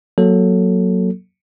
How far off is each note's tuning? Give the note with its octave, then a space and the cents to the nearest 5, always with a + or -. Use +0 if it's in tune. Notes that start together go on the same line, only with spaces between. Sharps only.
F#3 +0 A#3 +10 A4 +5